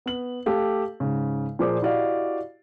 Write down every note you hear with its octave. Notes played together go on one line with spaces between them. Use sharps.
B3 F#7
A3 G4 A4 F5
G#2 C#3
A#2 F3 G#4 C5 D5 D6
E4 F#4 G4 D5 D#5 F5